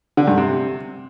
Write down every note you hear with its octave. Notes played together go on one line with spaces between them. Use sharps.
D3
G2
C3